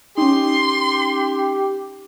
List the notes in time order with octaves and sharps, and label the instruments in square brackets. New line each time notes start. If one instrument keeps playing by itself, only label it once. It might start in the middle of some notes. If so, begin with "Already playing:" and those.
[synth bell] C#4 D#4 [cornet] G4 [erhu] C6